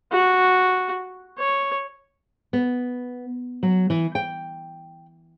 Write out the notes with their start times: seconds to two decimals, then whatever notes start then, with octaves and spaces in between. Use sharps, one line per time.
0.12 F#4
1.38 C#5
2.53 B3
3.63 F#3
3.90 E3
4.15 G5